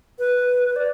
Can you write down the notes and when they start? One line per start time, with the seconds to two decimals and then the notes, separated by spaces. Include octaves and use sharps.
0.19 B4
0.76 D5